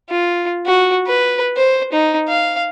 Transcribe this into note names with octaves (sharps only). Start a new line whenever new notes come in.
F4
F#4
B4
C5
D#4
F5